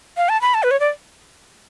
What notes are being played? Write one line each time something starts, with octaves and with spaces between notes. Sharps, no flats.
F5
A5
B5
A5
B4
C#5
D5